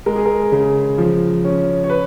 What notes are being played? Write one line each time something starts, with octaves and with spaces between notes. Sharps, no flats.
G#3 A#4
G#4
A#4
C#3
F3
C#4
C#5
B4